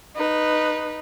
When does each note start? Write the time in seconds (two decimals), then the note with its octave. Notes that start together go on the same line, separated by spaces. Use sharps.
0.16 D#4 B4